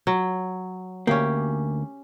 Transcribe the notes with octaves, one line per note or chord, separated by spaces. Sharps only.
F#3
D2 A#3 C#4 G4